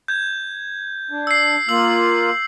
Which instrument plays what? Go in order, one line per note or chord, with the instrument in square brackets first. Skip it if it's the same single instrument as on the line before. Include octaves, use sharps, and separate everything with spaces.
[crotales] G6 G#6
[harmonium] D4
[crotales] E6 C7
[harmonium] A#3 F4 [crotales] E6 F#7